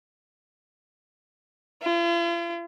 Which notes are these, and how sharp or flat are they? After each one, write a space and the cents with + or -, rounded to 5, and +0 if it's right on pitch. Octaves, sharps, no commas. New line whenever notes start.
F4 -45